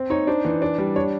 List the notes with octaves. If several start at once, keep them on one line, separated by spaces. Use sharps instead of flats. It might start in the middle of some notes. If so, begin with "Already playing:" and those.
Already playing: C4
D#4 C#5
D4 C5
E3
D4
G3
D4 C#5